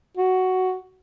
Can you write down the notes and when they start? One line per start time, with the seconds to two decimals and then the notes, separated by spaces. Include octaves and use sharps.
0.17 F#4